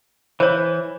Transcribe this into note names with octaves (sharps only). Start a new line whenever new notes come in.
E3 C5 C#5